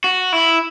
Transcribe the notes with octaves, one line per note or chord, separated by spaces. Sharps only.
F#4
E4